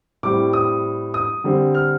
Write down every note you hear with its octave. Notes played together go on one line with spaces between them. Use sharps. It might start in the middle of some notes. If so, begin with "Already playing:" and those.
A2 G3 C4 D6
D#6
D#6
D3 G3 C4
F6